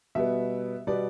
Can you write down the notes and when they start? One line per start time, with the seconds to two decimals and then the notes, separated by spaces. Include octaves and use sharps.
0.15 B2 G3 B3 E5
0.87 B2 G3 B3 D5